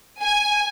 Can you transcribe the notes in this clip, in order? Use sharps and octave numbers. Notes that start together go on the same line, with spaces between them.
G#5